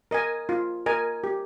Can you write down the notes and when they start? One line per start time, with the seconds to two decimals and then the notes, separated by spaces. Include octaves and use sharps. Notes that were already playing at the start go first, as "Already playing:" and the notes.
0.11 A#4 D#5 G#5
0.49 F4
0.86 A#4 D#5 G#5
1.24 G4